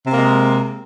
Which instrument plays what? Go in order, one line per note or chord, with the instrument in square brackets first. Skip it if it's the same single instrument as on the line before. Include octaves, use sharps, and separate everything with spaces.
[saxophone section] C3
A#3
G#3